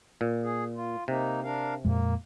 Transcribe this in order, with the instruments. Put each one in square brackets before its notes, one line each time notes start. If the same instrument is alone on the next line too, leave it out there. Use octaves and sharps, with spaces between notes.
[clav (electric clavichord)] A#2
[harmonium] G#4
F4
[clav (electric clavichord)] C3 [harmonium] A#3 D#4
[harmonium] D4 A#4 F5
[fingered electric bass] F2 A#2 G#3 [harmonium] A#3